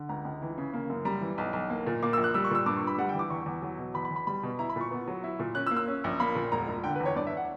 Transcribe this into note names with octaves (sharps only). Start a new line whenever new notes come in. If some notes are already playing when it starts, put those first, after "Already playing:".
Already playing: D3
C#2 A#5
C#2
E3
C#3
A#3
F#2
G3 A#5
E3
B1
B1
A#3
A#2
A#3 D6
E6
A#1
F#6
G3 E6
C#6
A#2 E6
G2 D6
C#6
G2
B5
G3 F#5
G5
E3
D6
E2 C#6
E2
F#3
B2
E2 B5
B5
E2
B5
G3 B5
B2
E4 A#5
B5
A#2
C#6
B3
F#3
E4
A#2
C#4 F#6
E6
A#3
E6
C#4
A#1
A#3 B5
A#2
E1 A#5
E1
D3 G5
B4
E2 C#5
G2 D5
E5
F#5